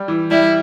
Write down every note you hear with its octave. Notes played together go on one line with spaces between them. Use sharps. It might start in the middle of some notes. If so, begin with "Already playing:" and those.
Already playing: G3
E3
G3 E4